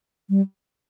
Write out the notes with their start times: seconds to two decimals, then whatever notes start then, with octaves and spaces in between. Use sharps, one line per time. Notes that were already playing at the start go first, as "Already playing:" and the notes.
0.30 G3